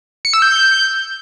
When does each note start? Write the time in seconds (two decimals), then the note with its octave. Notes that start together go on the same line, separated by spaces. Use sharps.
0.25 C#7
0.33 E6
0.42 G6